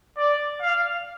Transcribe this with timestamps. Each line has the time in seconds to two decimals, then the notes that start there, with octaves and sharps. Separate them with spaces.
0.17 D5
0.61 F5